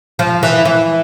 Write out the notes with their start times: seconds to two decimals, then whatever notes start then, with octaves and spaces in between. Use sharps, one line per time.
0.19 F3
0.43 E3
0.65 E3